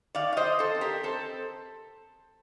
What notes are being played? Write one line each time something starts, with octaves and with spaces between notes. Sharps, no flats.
D#3 D5 F5
F5
C5 D#5
D#3
A4 C5
C4
G4 A#4
C4 A4 C5